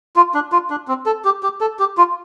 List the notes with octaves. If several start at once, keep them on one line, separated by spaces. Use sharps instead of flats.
F4
D4
F4
D4
C4
A4
G4
G4
A4
G4
F4